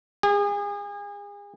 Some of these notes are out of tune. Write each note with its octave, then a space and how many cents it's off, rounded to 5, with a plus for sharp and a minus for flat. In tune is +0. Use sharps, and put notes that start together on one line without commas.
G#4 -35